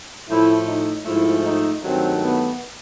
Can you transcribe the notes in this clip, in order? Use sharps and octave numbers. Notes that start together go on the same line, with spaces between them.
A2 F3 A3 E4
D#4
G#2 F3 A3 E4
D#4
G2 D#3 F#3 A3 C4
B3